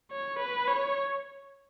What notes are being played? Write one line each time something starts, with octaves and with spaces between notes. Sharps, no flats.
C#5
B4
C#5